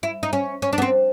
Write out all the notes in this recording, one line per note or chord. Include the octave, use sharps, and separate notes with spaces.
E4
D#4
C#4
C#4
D4
B3
C4